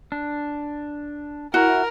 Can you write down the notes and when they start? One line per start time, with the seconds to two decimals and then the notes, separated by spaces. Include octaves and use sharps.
0.12 D4
1.54 E4 F#4 A#4